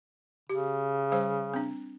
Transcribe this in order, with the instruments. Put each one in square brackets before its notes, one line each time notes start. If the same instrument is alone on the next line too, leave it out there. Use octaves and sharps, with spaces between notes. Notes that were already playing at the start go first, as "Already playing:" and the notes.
[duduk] C#3 [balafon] G4
[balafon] G3 C5 F5
C4 D4